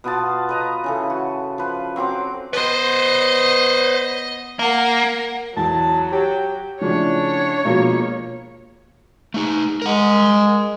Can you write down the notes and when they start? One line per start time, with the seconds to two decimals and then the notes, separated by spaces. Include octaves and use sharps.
0.04 B2 B3 F4 A5
0.49 B4 D#5 A#5
0.84 C#3 E3 A4
1.10 F#4
1.58 F3 B4
1.96 F#3 C4 C5 D6
2.53 B3 B4 C5 D#5
4.59 A#3 A#4 F#5
5.57 E2 F#3 A5
6.12 G4 C#5
6.81 A2 C#3 F3 D4 C#5
7.65 B2 F3 G#3 A#3
9.34 A3 D#4
9.82 G#3 A#4 F#5